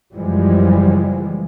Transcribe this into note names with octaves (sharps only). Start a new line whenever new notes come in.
F#1 F#2 E3 F3 G3 G#3